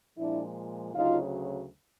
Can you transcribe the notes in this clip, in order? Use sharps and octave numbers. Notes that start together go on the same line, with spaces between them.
A#2 F3 G#3 D4 E4
D2 C#3 F#3 D#4 F4